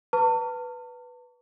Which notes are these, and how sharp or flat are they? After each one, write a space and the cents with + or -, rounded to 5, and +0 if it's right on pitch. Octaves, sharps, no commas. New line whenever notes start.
B4 +0 A5 +40 C#6 +40